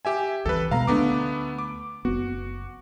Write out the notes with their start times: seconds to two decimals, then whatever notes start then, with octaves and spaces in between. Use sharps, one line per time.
0.05 G4 E5 G#5
0.46 C2 E3 A4 B4
0.71 B2 G#3 B3 F5 A#5
0.87 D2 G#3 A3 B3 D4 D6
1.59 D6
2.05 F#1 B3 F#4